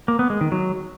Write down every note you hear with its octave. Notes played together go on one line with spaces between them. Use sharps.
A#3
B3
G#3
D#3
F#3